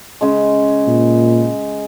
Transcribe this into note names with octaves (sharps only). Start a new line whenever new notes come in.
C#3 G#3
A#2